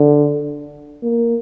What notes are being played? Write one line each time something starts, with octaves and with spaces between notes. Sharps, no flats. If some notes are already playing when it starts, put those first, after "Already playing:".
Already playing: D3
A#3